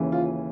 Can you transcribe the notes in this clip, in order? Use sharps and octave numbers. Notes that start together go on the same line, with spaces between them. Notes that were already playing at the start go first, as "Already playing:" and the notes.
Already playing: D#2 C#3 E3
F4